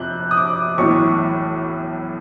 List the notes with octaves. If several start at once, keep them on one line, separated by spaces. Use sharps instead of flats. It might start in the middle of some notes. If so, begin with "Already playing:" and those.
Already playing: F2 C3 F#6 G6
D#6
D6
B1 A2 E3 C#6